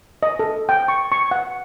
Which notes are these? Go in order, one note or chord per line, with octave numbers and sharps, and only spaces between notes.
D#5
A4
G5
C#6
C#6
F#5